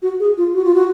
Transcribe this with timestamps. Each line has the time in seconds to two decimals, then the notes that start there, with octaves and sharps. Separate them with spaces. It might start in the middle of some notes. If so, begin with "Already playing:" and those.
0.02 F#4
0.20 G#4
0.37 F4
0.54 F#4
0.64 F4
0.75 F#4